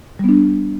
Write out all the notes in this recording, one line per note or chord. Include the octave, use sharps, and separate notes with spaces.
G3 B3 D4